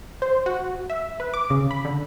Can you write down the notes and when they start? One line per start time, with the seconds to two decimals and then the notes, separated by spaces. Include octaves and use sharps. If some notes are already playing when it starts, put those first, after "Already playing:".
0.22 C5
0.46 F#4
0.90 E5
1.20 B4
1.34 D6
1.50 C#3
1.71 B5
1.85 D3